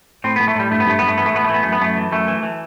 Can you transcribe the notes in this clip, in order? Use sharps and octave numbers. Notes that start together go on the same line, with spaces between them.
A2 C4
B3
A2
A3
A2 G3
G2 A3
B3
G2 A3
G2 B3
A3
E3 B3
A3
A2 B3
A3
E3 B3
F#2 A3
B3
F#2 A3
E3
F#2 A3
E3
E3